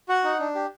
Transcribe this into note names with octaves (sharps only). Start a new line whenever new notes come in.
F#4 F#5
D#4
D4
G4